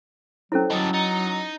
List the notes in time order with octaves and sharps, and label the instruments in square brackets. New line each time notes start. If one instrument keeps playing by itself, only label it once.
[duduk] F#3 [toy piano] C#4 E4 [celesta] A4 C5 C#5
[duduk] F#3 [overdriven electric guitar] G3 A4 [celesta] D#5 D#6 A6
[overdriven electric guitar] D#4 [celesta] A6 C#7 G7